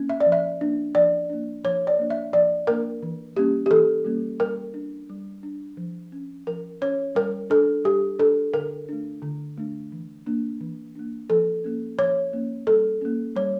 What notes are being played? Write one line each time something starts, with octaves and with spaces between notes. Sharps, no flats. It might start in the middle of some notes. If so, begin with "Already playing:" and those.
Already playing: A#3 C#4
E5
D5
F3
E5
A#3 D4
F3 D5
A#3 D4
F3 C#5
D5
A#3 D4
E5
F3 D5
A#3 D4 A#4
E3
G3 A#3 C#4 G4
G4
E3 A4
G3 A#3 C#4
G3 A#4
D4
G3
D4
F3
C#4
F3 A#4
C#4 C#5
G3 A#4
D4 A4
G3 G4
D4 A4
D3 A#4
A3 D4
D3
A3 D4
E3
A#3 D4
E3
A#3 D4
F3 A4
A#3 C#4
F3 C#5
A#3 C#4
G3 A4
A#3 C#4
G3 C#5